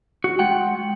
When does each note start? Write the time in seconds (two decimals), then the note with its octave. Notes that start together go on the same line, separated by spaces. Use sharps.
0.24 F#4
0.39 G#3 F#5 G5